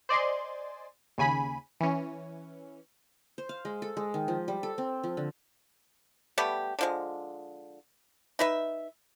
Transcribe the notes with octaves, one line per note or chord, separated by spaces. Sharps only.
C5 D5 D#5 G#5 C6
D#2 C#3 G#5 B5 B6
E3 C#4
C5
F5
G#3
A4
G#3
D#3
F3
G3
A4
C4
F3
D3
G3 A3 B3 G4
D3 F3 G#3
D#4 B4 E5